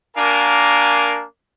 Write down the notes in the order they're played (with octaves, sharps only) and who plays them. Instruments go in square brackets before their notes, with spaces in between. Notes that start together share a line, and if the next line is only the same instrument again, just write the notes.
[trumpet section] A#3 D4 F#4 A#4 F5 G#5